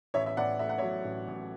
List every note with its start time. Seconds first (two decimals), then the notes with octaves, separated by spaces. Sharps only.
0.14 A1 C#5 E5
0.26 E5
0.37 A1 D5 F#5
0.59 A2 E5
0.69 F#5
0.78 F#3 C#5 E5
1.04 A1
1.28 A1